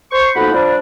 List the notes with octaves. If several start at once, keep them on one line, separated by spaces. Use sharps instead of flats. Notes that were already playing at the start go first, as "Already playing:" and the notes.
C5 C#6
F2 B2 A#3 D#4 F#5 B5
F3 G3 D4